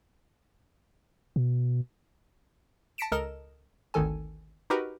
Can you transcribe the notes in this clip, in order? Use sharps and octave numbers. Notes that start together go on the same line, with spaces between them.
B2
A5 A#6 B6 C#7 D7 E7
C#2 A4 A#4 D#5 E7
G#1 D2 D#3 A4 G#5
D#4 F#4 G4 A#4 B4